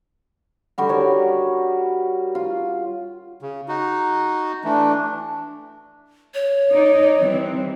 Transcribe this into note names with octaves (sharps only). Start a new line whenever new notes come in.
D3 G3 F#4
A#4 C#5
F4
C#3
D#4 F#4
E3 A3 D4
C#5
D#4 D5
E3 G3 C4